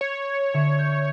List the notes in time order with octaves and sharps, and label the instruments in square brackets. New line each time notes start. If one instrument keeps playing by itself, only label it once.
[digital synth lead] C#5
[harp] D3 E5 C#6
G6